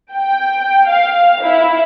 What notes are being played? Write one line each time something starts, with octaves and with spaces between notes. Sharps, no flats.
G5
F5
E4